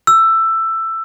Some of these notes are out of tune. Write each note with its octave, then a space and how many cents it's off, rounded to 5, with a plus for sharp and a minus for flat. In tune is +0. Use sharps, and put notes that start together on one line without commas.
E6 +10